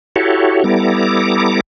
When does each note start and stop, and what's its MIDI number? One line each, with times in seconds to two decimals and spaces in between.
0.16 0.64 64
0.16 0.64 66
0.16 0.64 67
0.16 0.64 69
0.16 0.64 73
0.64 1.60 55
0.64 1.60 59
0.64 1.60 64
0.64 1.60 69
0.64 1.60 82
0.64 1.60 86